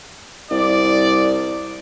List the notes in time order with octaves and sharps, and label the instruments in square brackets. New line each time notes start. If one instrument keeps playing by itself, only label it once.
[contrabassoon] C2 [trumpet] D5